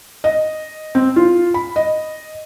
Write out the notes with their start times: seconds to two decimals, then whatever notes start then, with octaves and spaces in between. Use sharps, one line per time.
0.24 D#5
0.95 C4
1.16 F4
1.54 B5
1.76 D#5